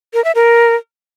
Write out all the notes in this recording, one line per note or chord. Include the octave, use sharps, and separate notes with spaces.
A#4
E5
A#4